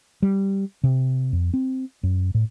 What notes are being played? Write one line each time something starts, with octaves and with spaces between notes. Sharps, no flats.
G3
C3
F2
C4
F#2
A2